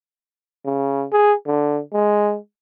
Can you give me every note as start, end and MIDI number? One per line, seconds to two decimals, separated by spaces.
0.65 1.05 49
1.12 1.34 68
1.47 1.81 50
1.93 2.37 56